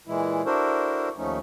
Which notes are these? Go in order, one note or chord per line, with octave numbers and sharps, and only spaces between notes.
A#2 E3 G#3 E4
D4 E4 F#4 A4 A#4 C5
D#2 F3 A3 C#4 D#4